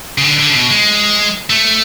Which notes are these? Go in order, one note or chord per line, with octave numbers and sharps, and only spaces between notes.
C#3
D3
D3
C#3
B2
G#3
A3